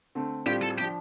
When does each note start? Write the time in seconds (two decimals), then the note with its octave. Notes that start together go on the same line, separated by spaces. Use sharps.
0.15 D3 A3 C4
0.46 A2 G3 C4 F4 G4 D5
0.62 A4
0.78 F3 D4 G4